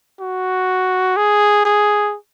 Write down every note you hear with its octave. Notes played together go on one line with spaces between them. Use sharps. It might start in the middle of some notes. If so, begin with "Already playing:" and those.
F#4
G#4
G#4